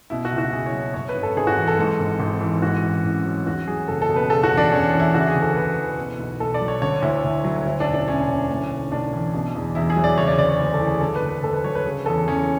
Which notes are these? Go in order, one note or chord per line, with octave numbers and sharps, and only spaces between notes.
B2 E4
F#4
C#2
F#4
C#2 G#4
C#5
F#3
F#2 C#5
B4
G#1
A4
G#1 G#4
F#4
E3
A4
G#2
G#1
G#1
E3
G#2 F#4
A1
A1
F#3
E2 F#4
F#3 G#4
F#1 A4
A4
B2
B4
C#3 A4
F#4
E2
D4
E2 C#4
E3
E4
C#3 F#4
G#4
D2
A4
D2 B4
E3
B2
B1
B1 A4
D5
F#3
C#5
D3 C#5
D2 E4
D2
F#3
D2 E4
D4
E1
D4
E1 C#4
D3
A2
B1
B1 D4
E3
B2
E2
E2 E4
G#4
F#3
D5
C#3 C#5
D5
D2 D5
C#5
D2
A4
E3
G#4
D3 A4
B4
D2
B4
D2 A4
B4
F#3 C#5
B4
C#3
E2 A4
E2 C#4